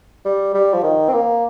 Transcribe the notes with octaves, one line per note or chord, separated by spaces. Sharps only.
G3
G3
F3
D#3
C4
A#3